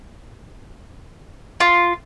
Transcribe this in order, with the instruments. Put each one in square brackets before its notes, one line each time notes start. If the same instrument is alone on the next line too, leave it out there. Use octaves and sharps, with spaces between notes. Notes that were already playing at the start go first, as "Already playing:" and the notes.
[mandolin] F4